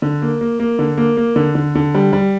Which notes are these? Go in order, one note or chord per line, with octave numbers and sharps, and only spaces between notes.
D3
A#3
A#3
A#3
D3
A#3
A#3
D3
D3
D3
G3
G3